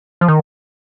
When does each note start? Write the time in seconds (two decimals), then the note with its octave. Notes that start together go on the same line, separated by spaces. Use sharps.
0.21 F3
0.28 D#3